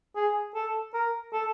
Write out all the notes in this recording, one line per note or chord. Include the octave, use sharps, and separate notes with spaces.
G#4
A4
A#4
A4